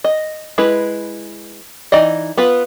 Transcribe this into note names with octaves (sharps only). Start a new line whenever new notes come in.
D#5
G#3 E4 B4
E3 D#4 D5 D#5
B3 F4 B4